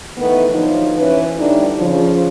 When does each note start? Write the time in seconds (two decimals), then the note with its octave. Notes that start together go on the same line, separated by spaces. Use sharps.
0.18 D#3 E3 A3 B3
0.51 D3 F3 F#3 D#4
0.97 E3 C#4 B4
1.38 A2 D3 G3 D4 D#4
1.79 C#3 F3